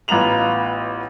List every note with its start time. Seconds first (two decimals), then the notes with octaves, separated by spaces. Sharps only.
0.08 A1 B3 F4 A#5 F7 F#7